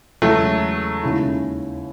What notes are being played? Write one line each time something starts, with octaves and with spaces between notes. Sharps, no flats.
E2 C#3 F#3 G#3 A3
D#2 C#3 G#3 C#4 E4